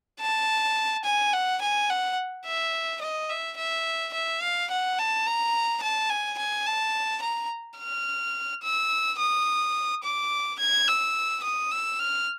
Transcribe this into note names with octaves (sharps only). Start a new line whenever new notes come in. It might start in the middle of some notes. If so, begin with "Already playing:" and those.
A5
G#5
F#5
G#5
F#5
E5
D#5
E5
E5
E5
F5
F#5
A5
A#5
A5
G#5
G#5
A5
A#5
F6
E6
D#6
D6
G#6
E6
D#6
E6
F6